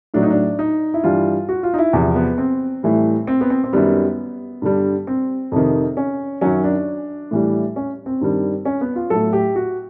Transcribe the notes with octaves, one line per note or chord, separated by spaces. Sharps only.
A2 F#3 D4
D#4
D4
D#4
E4
G2 E3 G3 F4
F#4
F4
D#4
E4
E2 C3 F3
B3
C4
A2 E3 G3
C4
B3
C4
C4
F#2 D#3 G3 B3
G2 D3 G3
C4
F2 C3 D#3
C#4
F#2 D#3 F#3 C#4
D4
A2 E3 G3
C#4
C4
G2 D#3 G3
C#4
B3
F4
A2 F#3 A4
G4
F#4